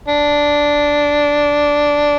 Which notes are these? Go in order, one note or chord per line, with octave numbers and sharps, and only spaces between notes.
D4